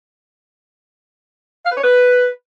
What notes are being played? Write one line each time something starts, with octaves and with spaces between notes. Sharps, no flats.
F5
B4
C#5
B4